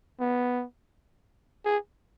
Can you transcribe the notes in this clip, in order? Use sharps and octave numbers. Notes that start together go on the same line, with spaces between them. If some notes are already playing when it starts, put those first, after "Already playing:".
B3
G#4